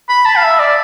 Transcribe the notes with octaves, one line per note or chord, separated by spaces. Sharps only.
B5
A5
F5
E5
D5